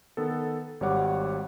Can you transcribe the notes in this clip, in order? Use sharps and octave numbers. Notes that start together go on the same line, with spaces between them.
D#3 B3 A4
G#1 G3 C#5 F#5 D6